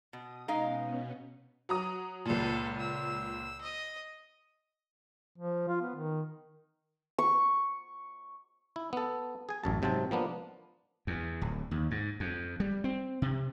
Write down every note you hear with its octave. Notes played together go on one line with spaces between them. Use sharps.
B2 D#6
B2 G#3 B3 C#4 D#4 F5
F#3 A#5 D#6
C#2 A#2 A4
E6
D#5
F3
F4
B3
D#3
C#6
E4
B3 A4
G#4 G#5
A1 F#2 A5
G#2 C3 F#3 C4 A5
F3 A#3 B3 D4
E2
D1
D#2
G#2
F2
G3
C4
C3